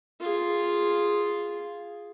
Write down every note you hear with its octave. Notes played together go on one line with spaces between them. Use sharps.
F4 G#4